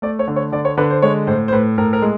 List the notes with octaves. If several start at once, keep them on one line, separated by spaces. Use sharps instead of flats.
A3 D5
C#5
D3
C#5
D3 D5
C#5
D3 B4
C5
G#3 C#5
A2 C5
C5
A2 B4
A2 A#4
A#4
G#3